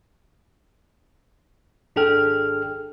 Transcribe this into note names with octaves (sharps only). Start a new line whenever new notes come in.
G#1 D4 G#4 A4 G5 F6